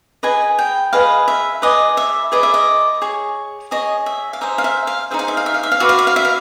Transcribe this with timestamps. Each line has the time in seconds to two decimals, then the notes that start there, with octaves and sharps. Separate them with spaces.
0.23 G#4 B4 D#5 G#5
0.59 G5
0.93 G#4 B4 D#5 F5
1.28 E5
1.62 G#4 B4 D5 D#5
1.97 E5
2.32 G#4 B4 D5 D#5
2.43 E5
2.54 D#5
3.02 G#4 C#5
3.71 G#4 C#5 D#5
4.06 E5
4.33 F5
4.41 D#4 G#4 C5 E5
4.58 F5
4.64 E5
4.87 F5
5.11 D#4 G#4 C5 E5
5.19 F5
5.28 E5
5.37 F5
5.46 E5
5.54 F5
5.63 E5
5.72 F5
5.80 F#4 B4 D5 E5
5.89 F5
5.99 E5
6.07 F5
6.16 E5
6.25 F5